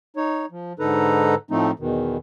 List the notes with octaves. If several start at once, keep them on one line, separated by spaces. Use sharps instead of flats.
D#4 C#5
F3
G#2 D3 D#4 A4 B4 A#5
A2 F3 A3 C4 D#4
E2 B2 D#3